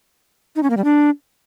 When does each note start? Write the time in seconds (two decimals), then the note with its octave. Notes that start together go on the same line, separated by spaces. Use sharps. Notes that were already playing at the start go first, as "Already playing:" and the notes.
0.56 D#4
0.63 C#4
0.70 A#3
0.77 G3
0.84 D4